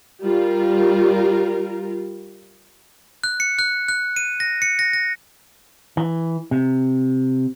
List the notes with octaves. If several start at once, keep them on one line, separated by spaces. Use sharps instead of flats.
G3 F4 A#4
F#6
C#7
F#6
F#6
D#7
A#6
C#7
A#6
A#6
E3
C3